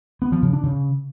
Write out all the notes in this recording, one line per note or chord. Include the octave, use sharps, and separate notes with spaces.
B3
F3
C#3
D4
C#3